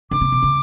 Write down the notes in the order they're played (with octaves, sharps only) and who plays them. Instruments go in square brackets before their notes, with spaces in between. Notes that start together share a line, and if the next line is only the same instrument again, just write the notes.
[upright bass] D3 [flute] D6
[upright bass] C#3
B2
C#3